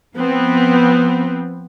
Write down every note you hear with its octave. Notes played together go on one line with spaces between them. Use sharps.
F3 B3 C4